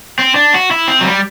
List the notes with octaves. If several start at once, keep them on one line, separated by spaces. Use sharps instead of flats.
C4
D4
F#4
E4
C4
F#3
G3